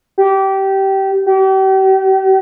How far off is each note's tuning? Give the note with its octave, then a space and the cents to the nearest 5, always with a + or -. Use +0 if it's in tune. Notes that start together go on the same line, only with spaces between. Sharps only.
G4 -20
G4 -40